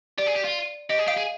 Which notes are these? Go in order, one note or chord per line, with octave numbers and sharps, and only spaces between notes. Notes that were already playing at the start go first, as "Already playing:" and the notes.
G4 D5
G#4
G4
F4
G4 D#5
G#4
G4 F5
G#4